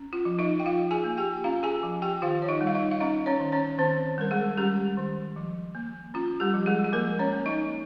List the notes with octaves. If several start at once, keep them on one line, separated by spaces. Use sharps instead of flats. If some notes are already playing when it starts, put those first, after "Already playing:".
Already playing: C#4
F4
F3
D#4 D#5
G5
F3 F4 F5
G#4 G#5
A#3
G4 G5
C#4 F4 F5
G#4 G#5
F3
G4 G5
D#3 F4 F5
C#5
D#4 D#5
G3
F5
D#4 D#5
F5
C#4 D#4 D#5
C#4 C#5
D#3
C#4 C#5
D#3 C4 C5
G3 A#4
G#3 G#4
G3 C#4 G4
D#3
F3
A#3
C#4 F4
G3 G4
F3
G#3 G#4
G#4
F3 A#3 A#4
C#4 C#5
A#3
D#4 D#5